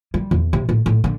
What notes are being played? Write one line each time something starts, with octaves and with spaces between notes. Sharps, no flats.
G3
E2
C3
A2
A2
D3